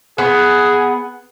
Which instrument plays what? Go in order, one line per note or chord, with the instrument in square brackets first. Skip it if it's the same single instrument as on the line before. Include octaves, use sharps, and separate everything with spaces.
[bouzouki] B3 [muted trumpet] G#4